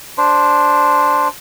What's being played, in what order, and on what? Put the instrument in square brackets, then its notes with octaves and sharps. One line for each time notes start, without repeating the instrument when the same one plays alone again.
[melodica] D4 C5